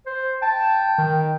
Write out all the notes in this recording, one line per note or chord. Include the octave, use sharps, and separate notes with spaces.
C5
G5 A5
D#3